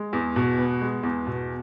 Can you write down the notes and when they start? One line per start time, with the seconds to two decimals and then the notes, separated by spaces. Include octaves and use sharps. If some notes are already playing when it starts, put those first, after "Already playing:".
Already playing: G#3
0.13 E2
0.36 B2
0.58 B3
0.81 G#3
1.03 E2
1.27 B2